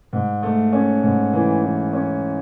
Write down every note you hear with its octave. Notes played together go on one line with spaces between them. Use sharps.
G#2
A3
C#4
G#2
E3
E3
C#4